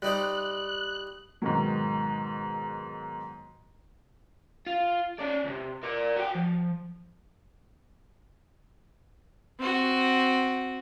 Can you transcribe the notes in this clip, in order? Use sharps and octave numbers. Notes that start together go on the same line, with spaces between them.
G3 D#4 C5 F#6
G#2 B2 D#3 F#3
F4
C#4 D5
C#2 C3
A#4 D5
F#4 G5
F3
C4 F#4